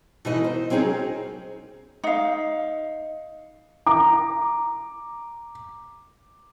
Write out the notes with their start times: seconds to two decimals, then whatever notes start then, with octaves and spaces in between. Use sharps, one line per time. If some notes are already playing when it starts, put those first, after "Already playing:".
0.25 B2 E3 D#4 A#4 D#5
0.44 C5
0.70 F#3 C4 C#4 D#4 G#4 A#4
2.04 D#4 F5
3.87 A#5 D6